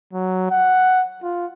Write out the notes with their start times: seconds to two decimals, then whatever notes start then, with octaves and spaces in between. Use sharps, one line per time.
0.13 F#3
0.50 F#5
1.23 F4